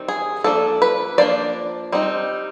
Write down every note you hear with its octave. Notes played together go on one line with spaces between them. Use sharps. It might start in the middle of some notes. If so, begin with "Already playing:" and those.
Already playing: D#3 G3 C4
G#4
F3 A#3 D4 A4
B4
F3 A#3 D4 D5
G3 C4 D#4